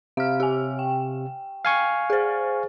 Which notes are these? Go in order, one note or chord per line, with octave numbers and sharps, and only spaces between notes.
C3 F5 F6
G4 G#5
G5
F5 G#5 C#6
G#4 C5